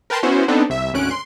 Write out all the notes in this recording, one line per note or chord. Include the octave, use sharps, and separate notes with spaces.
A#4 B4 G5 A5 C6
B3 C#4 E4 F#4 C5
B3 C4 D4 D#4 A4
C2 E5
G#1 D2 C#4 F#6 D7
C6